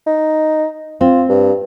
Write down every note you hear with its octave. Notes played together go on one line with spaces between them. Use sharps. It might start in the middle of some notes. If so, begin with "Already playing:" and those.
D#4
C4 F4
G2